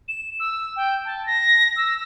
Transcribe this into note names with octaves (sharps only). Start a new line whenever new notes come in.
E7
E6
G5
A5
A#6
E6